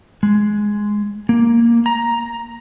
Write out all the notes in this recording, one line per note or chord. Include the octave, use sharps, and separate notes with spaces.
G#3
A#3
A#5